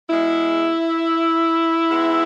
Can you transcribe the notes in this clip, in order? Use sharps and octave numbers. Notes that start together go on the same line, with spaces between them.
E2 B2 G#3 E4
G#2 G#3 B3